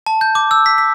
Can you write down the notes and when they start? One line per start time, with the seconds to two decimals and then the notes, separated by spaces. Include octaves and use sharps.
0.06 A5
0.21 G6
0.35 D6
0.51 E6
0.66 B6
0.78 B6